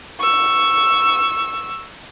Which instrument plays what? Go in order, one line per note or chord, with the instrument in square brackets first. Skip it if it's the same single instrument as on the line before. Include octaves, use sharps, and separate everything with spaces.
[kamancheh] C#6 E6